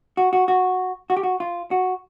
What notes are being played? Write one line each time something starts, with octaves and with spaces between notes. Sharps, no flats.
F#4
F#4
F#4
F#4
G4
F#4
F4
F#4